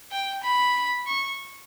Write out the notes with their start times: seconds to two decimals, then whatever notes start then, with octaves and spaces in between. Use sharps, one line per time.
0.11 G5
0.43 B5
1.07 C#6